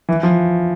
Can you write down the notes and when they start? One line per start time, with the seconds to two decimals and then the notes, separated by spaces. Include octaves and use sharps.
0.09 E3
0.23 F3